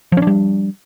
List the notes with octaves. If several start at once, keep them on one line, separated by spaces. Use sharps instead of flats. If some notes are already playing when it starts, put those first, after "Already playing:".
F3 G3 C#4 D4